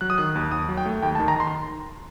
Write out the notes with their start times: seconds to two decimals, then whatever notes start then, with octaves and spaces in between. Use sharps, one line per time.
0.01 F#3 F#6
0.10 D#6
0.18 D#3 F#6
0.35 D#2
0.52 D#2 D#6
0.69 F#3
0.77 G5
0.86 A3
1.02 D#2 G5
1.15 A5
1.20 D#3
1.28 A#5
1.36 D#3 C6
1.48 C6